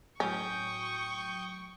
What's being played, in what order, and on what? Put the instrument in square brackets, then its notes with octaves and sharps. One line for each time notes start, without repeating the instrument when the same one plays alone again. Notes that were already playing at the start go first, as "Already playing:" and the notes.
[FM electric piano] A2 F#3 [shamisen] C#4 [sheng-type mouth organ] G5 D#6 G6 [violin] C#6